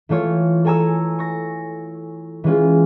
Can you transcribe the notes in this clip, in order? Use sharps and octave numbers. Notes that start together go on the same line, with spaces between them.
E3 A3 F4 C#5
A4 C#5 G#5 A#5 E6
C#6 A#6
E3 G#3 C#4 F4